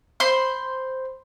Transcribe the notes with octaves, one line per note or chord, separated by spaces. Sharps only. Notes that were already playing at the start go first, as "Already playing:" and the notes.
C5 B5 C6